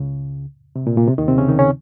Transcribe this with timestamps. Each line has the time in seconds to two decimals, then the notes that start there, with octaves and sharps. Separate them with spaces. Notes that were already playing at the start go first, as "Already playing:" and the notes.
Already playing: C#2 C#3
0.76 C3
0.87 A#2
0.97 A#2
1.08 C3
1.18 D#2 D#3
1.28 C3 C4
1.38 C#3 C#4
1.48 D#3 D#4
1.59 C#3 C#4